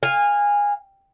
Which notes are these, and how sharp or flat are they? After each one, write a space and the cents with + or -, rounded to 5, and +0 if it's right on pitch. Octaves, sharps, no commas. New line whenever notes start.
F5 +0 G#5 -20